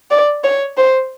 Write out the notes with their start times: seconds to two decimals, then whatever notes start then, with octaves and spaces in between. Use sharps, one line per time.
0.11 D5
0.44 C#5
0.77 C5